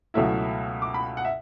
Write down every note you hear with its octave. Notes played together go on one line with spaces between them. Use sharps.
C#2 B2 F#3 A3 E4 E5
D6
B5
F#5
E5